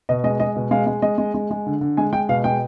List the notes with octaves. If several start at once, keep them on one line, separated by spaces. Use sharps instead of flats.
B2 D#5
G#3 D#5
G#3 D#5
B2
G#3 F5
G#3
G#3 D#5
G#3
G#3
G#3
D3
D3
G#3 G#5
G#3 G5
B2 F5
G#3 G5